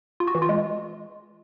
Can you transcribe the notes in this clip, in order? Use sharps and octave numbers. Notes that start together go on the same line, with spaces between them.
F4
F#4
E3
F4
G#3